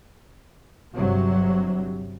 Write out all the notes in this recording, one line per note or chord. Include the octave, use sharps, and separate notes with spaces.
G1 G2 C3 F#3